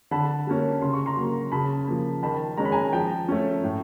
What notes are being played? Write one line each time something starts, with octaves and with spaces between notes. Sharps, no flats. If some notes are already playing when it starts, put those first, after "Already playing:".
D3 A5 B5
G3 A#3 C#4
C#3 C6
C#6
A#5 C6
F#3 A#3
C#3 A5 B5
F3 A#3
D#3 A5 B5
G#3 C#4 A#5
B5
G#5 A#5
F3 G5 A5
A3 C#4
A2